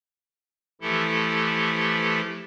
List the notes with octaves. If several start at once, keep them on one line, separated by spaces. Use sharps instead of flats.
E3 F3 A3 E4 G4 A4